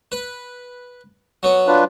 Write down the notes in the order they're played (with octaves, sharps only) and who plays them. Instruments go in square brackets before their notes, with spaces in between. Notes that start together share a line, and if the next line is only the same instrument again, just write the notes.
[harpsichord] B4
F#3 B3
[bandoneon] D4 F4 B4